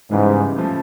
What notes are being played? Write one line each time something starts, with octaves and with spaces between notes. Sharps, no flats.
G#2 C#3 E3 G3 B3
C#3 F3 A3